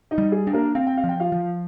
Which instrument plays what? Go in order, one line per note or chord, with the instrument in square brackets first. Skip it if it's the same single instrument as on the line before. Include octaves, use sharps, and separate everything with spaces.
[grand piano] D#4 D#5
[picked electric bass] G3
[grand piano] G#4
[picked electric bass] D4
[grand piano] A#3 A#4
[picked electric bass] C4 [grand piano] F5
[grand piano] G5
F5
[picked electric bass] F3
[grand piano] G5
F4 F5
[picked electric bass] F3